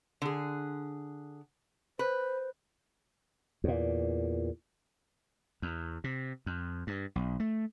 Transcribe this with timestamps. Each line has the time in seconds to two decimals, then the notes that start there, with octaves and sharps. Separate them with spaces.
0.22 D3 G#4
1.99 B4 C5
3.64 E2 A#2
5.62 E2
6.04 C3
6.46 F2
6.87 G2
7.16 B1
7.40 A3